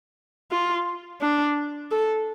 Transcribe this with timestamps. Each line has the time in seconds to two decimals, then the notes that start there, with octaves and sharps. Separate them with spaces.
0.51 F4
1.22 D4
1.91 A4